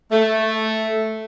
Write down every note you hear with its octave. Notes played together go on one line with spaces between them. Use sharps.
A3